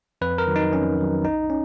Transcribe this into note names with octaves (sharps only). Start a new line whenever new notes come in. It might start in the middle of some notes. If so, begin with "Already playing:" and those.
F2 B4
A#4
D#3 F#3
D#4
F2 C#4
D#3 F#3
B1 D#4
C#4